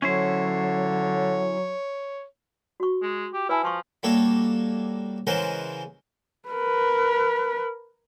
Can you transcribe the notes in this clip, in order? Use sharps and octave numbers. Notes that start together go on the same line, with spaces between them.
D3 F#3 C#4 E4 C5 C#5
F#4 C#6
G#3
G4
E4 B4 G#5 A5
F3 A5 C6 C#6
G3 A#3 F#4 A4 C#5
C#3 E3 G#3 A#4 C5 F#5
A#4 B4